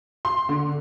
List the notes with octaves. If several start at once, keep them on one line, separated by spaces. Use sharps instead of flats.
C6
D3